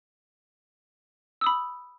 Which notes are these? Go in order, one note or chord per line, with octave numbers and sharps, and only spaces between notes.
B5 D#6 E6